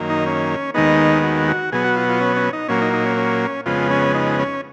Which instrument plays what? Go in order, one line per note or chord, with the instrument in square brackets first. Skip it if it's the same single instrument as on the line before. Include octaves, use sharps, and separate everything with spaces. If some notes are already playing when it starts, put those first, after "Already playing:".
Already playing: [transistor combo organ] F#2 D#3 A#3
D#4
C#4
D#2 D#3 G#3 B3 D#4
F#4
F#4
B2 F#3 B3 G#4
F#4
F4
F4
C#4
C#4
D#4
A#2 F#3 A#3 C#4
D#4
D#4
C#4
C#4
F2 C#3 G#3 B3 F4
C#4
D#4
C#4